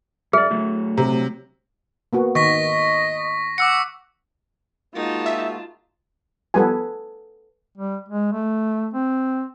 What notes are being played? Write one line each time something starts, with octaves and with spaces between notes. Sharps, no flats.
F#2 G#4 D5 E5 F6
D3 F#3 A3
C3 A#5
A#3 B3 F#4
D#3 D#5 C#6 A#6 B6
F#5 D6 E6 C#7
G#3 A#3 D#4 F4 F#4 A5
E5
F3 G3 B3 A4 B4 G#5
G3
G#3
A3
C4